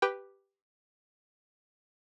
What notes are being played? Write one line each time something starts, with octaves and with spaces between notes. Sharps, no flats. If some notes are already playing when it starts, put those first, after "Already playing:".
G4 B4 G5